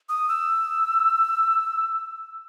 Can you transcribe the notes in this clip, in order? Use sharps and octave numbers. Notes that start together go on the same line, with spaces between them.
D#6
E6